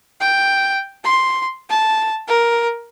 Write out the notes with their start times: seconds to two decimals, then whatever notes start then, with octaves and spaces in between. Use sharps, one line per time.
0.20 G5
1.04 C6
1.69 A5
2.28 A#4